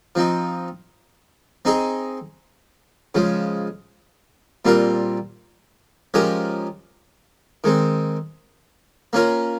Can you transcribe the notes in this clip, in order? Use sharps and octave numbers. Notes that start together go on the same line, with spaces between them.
F3 C4 D#4
C4 D#4 G#4 D#5
C#3 F3 G#3
A#2 G3 C4 F4 A#4
F3 G#3 C#4 G4 A#4
D#3 G#3 C4
A#3 C#4 F4 A#4